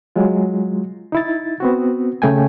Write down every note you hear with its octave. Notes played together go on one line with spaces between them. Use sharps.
F#3 G#3 F4
D#4 E4 A6
B3 C4 F#4
C#3 A3 G5 G#5